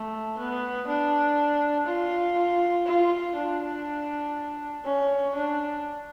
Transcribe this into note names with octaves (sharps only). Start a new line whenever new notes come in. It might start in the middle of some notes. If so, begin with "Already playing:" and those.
Already playing: A3
B3
D4
F4
F4
D4
C#4
D4